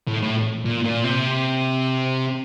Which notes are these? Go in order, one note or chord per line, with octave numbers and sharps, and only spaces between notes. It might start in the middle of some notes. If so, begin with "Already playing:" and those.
A2
A2
A#2
A#2
C3